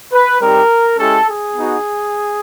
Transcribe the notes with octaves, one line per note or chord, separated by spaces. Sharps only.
B4
G3 C4 D#4 G4 A#4
G#3 C#4 E4 G4 A4
G#4
B3 D#4 F#4